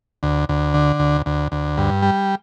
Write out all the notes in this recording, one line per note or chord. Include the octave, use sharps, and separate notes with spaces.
D2
D2
D3
D2
D2
D2
G2
G3